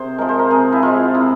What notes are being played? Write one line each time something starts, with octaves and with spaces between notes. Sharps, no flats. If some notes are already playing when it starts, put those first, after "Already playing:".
Already playing: C3 G#4 C5
F3 G#3 A#4
C5
A#4
C3 G#4
E4
F3 G#3 F4
C3 E4